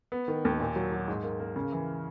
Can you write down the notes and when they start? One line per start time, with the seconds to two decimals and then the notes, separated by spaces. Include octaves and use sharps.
0.12 B3
0.28 D#3
0.45 D#2
0.60 A#2
0.76 F#3
0.92 F#3
1.08 G#2
1.24 A#3
1.40 A#3
1.56 C#3
1.72 E3